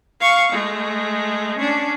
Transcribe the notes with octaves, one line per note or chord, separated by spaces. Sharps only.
F5 C#6
G#3 A3
C#4 D4